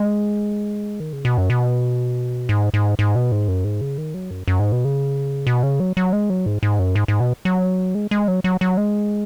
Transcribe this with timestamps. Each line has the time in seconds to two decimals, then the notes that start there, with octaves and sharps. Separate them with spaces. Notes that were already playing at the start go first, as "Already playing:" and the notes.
Already playing: G#3
1.00 D#3
1.13 C#3
1.25 B2
1.38 F#2
1.50 B2
2.49 G#2
2.74 G#2
2.99 G#2
3.15 B2
3.32 G#2
3.48 F#2
3.65 G#2
3.81 C#3
3.98 D#3
4.14 F#3
4.31 F#2
4.48 F#2
4.60 G#2
4.72 B2
4.85 C#3
5.47 B2
5.63 C#3
5.80 F#3
5.97 F#3
6.13 G#3
6.30 F#3
6.46 G#2
6.63 G#2
6.79 F#2
6.95 G#2
7.08 G#2
7.20 B2
7.45 F#3
7.95 G#3
8.11 G#3
8.28 F#3
8.44 F#3
8.61 F#3
8.77 G#3